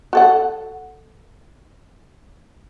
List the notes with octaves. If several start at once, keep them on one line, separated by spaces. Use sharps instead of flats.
F#4 A4 F#5